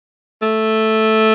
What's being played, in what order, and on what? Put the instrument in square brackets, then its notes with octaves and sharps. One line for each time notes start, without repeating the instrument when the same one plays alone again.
[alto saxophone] A3